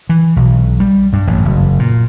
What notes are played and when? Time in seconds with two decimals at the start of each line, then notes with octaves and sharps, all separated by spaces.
0.09 E3
0.36 B1
0.80 G3
1.13 G2
1.27 A1
1.45 F#1
1.79 A#2